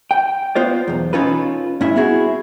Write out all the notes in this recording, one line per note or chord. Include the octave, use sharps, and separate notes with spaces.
G5
B3 F4 C5 D5
B1 E2
C#4 D#4 F4 A4 B4
G2 C#4 E4 E5
B3 C4 E4 F#4 G#4